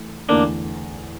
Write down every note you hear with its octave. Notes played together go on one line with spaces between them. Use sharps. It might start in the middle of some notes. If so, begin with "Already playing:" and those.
Already playing: E3 A3
E2 D3 A3 A#3 D4